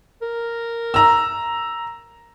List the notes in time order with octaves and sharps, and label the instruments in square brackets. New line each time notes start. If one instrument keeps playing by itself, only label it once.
[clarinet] A#4
[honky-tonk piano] A#5 E6